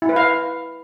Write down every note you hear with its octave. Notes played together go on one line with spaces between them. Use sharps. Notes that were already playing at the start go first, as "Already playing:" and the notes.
E4
B4
F5